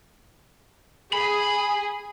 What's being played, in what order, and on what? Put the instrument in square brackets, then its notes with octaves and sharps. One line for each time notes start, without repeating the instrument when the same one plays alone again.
[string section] G#4 [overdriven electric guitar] B5